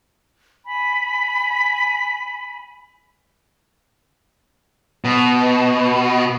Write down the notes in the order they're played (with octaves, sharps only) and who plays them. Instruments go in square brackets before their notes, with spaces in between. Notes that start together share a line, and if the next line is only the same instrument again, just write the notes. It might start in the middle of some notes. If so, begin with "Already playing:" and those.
[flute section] G#5 B5
[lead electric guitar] B2